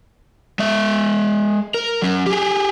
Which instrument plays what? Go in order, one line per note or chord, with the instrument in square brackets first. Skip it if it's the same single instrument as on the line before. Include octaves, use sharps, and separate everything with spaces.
[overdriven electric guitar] G#3 E5
A#4
F#3 C#4
G4 G#4